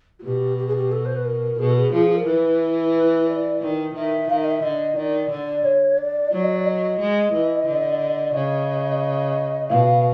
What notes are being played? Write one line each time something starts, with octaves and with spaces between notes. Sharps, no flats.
F#4
B2 G4
G4
G#4
G4
A4
C5
B4
A#4
B2 G#4
A4
G#4
F3 G#4
A#4
E3 B4
B4
D5
D#3
D#3 E5
D#3 F5
E5
D#5
E5
D3 D#5
D#3 D5
D3 D5
C#5
D5
F#3 D5
D#5
D5
D#5
G#3
E3
D3
D5
C#3 D#5
B2 F5